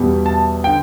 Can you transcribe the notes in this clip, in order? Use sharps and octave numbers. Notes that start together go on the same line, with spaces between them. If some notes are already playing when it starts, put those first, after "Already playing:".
Already playing: E2 B2 G3
A5
D3 G5